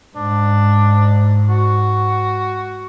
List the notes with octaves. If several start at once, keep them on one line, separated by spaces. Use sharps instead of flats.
G#2 D4
F#4